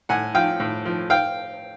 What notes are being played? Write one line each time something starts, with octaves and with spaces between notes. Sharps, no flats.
A2 F#5 G#5
F3 F5 G5
A2
F3
F5 G5